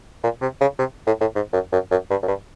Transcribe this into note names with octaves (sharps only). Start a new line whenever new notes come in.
A#2
C3
C#3
C3
A2
A2
G#2
F#2
F#2
F#2
G2
F#2
G2